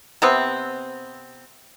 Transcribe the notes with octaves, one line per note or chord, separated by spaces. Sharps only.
C3 B3 C4